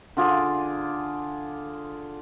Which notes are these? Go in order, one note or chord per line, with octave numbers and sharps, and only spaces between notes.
D3 F4 G#4 D6